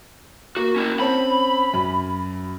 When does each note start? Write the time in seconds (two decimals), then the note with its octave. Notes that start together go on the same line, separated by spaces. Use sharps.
0.57 A#3 F#4
0.76 C#4 E4
1.00 C4 C#4 A5 B5
1.74 F#2